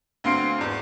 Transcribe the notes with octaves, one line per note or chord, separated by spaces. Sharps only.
D2 C4 F5 C6 C7 D7
G#1 E2